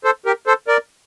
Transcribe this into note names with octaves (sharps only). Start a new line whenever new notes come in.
A4 C5
G4 A#4
A4 C5
A#4 D5